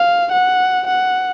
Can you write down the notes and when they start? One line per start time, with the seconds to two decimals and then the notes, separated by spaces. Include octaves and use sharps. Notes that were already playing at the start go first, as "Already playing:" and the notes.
Already playing: F5
0.31 F#5
0.87 F#5